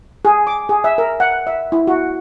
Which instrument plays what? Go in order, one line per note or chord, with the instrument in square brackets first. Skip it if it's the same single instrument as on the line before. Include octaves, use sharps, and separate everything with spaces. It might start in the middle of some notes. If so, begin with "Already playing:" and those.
[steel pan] G#4
D6
G#4
E5
A#4
F#5
E5
E4
F#4